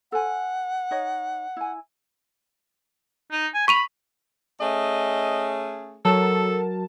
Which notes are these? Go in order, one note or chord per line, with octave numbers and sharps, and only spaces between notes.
A4 C5 F#5 G#5
D#4 C#5 D#5
E4 G#5
D#4
G#5
B5 C#6 D#7 F7
A3 C#4 G#4 D#5
F#3 A4 A#4 A5